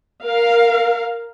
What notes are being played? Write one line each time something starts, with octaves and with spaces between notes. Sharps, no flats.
A#4 F5